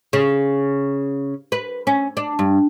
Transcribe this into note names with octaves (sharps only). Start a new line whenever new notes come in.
C#3
B4
C#4
D4
G2